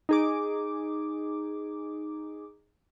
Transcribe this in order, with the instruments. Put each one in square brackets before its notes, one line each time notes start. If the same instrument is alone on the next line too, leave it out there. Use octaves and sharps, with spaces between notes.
[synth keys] D#4 G#4 D6